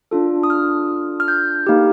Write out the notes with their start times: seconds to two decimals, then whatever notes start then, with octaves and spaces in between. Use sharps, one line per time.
0.11 D4 F4 A4
0.43 D#6
0.50 F6
1.20 F6
1.28 G6
1.66 A#3 D#4 G4